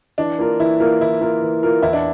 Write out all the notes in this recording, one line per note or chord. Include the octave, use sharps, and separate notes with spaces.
E3 D4
A#3 F4 A#4
E3 E4
A#3 F4 A#4
E3 E4
A#3 F4 A#4
E3
A#3 F4 A#4
E2 E4
D4